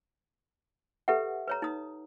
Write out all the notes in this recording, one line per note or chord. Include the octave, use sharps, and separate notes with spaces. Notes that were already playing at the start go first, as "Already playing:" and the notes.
G4 A4 B4 E5 F#5
B4 C#5 A#5
D#4 D#6